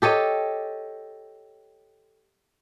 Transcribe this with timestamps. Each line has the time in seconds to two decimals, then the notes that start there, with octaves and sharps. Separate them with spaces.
0.02 G4 A4 C#5 D#5